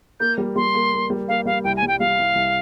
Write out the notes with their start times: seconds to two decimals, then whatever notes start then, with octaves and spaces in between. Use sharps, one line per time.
0.20 A#3 G6
0.38 G3
0.56 G3 C6
0.75 A#3
0.93 A#3
1.10 G3
1.28 A#3 F5
1.46 G3 F5
1.64 C2 G5
1.77 G#5
1.83 G3
1.88 G5
2.00 G3 F5
2.19 C2
2.35 C2